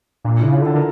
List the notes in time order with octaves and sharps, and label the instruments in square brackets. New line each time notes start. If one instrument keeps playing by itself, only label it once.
[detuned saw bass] A#2 [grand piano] D4
[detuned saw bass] C#3 [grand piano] E4
[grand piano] F4
[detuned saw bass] D3
[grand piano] A4
[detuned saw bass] D3 [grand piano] A#4